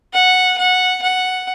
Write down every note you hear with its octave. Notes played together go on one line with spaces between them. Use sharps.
F#5
F#5
F#5